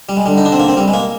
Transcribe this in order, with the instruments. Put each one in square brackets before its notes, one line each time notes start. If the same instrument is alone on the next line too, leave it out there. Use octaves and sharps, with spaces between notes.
[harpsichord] G3
G#3
[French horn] D3 [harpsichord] G3
[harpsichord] D#4
D4
C4
A#3
C4
G3
G#3
A#3